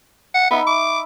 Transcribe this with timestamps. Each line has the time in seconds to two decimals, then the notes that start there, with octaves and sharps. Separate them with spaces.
0.34 F#5
0.51 B3 D#4 E5 B5
0.67 D6